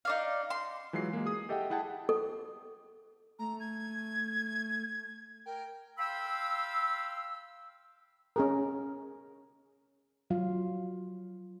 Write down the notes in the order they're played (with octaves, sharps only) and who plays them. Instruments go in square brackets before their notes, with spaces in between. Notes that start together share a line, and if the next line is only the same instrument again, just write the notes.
[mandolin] D#4 D5 F5
C6
[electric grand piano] E3 F#3 G#3 F4 C7
G#3 A#3
G#4 D#6
G4 A4 D#5 E5 F#5 G5
E4 G#4 F#5 G5 A5
[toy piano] A4
[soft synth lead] A3 [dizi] A#5
[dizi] G#6
[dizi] A#4 [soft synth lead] G5
[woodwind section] F5 G5 B5 C6 E6
[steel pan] C#4 G#4 A#4
[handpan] F#3 F4 F5